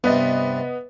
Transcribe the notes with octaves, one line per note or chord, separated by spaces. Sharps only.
G2 C3 B3 B4 D#5